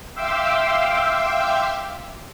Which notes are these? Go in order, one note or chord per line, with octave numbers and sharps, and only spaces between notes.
E5 F5 G5 C6 D6 E6